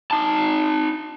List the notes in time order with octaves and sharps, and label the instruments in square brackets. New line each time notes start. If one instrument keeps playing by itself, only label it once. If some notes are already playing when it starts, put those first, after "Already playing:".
[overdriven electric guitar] D#4 A5